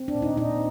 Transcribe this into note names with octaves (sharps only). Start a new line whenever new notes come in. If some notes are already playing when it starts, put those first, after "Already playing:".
Already playing: C4
D4
A#2
D#4
A#2 D#4